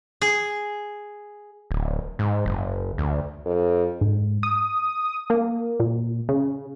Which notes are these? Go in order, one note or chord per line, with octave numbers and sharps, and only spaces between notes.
G#4
D1
G#2
F#1
D2
F2
G#2
D#6
A#3
A#2
C#3